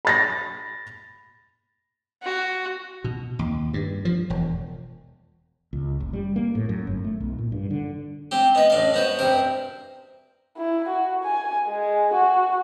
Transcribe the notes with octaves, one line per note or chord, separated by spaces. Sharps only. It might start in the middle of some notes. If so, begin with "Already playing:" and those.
B5 A6 A#6
F#4
B2
D#2
G2
F3
E1
C#2
F#1
G3
A#3
A2
F#2
G1
A3
B1
A#2
G2
D3
C4 G4
B3 B4 D#5
A1 D4 F5
B3 F#4 B4 C5
G2 C3 A#4
E4
F#4
G#5
G#3
F#4